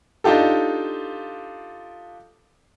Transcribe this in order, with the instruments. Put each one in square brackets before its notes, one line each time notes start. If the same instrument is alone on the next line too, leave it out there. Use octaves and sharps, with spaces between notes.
[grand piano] D4 D#4 F4 G4 A4